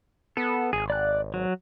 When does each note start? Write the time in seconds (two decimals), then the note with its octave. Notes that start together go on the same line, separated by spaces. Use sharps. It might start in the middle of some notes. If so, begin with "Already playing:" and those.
0.37 B3 A4
0.73 G#1 G#4
0.90 D5 F#6
1.34 F#3